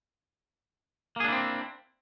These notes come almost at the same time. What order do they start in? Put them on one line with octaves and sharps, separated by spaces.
A#3 G#4 D4 E4 C4